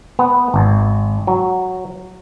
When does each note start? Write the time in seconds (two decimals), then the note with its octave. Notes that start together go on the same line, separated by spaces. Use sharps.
0.19 B3
0.54 G#1
1.27 F#3